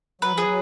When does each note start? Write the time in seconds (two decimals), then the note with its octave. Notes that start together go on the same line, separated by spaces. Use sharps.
0.21 F#3 B4
0.33 F3
0.38 G#4
0.44 F#3